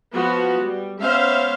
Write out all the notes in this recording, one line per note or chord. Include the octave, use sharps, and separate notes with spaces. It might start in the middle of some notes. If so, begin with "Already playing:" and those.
F3 B3 F#4
G3
B3 C#4 C5 E5 F5